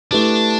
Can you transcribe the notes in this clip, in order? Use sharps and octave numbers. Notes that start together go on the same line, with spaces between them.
A3 D4 E4 G4 B4